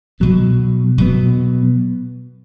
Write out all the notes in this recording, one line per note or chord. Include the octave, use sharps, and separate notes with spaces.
B2 F#3 B3
B2 F#3 B3